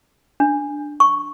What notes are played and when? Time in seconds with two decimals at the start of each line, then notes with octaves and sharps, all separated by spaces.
0.40 D4
1.00 C#6